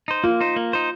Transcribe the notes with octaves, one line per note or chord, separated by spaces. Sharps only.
D#4 C5
A#3 F4
D#4 C5
A#3
D#4 C5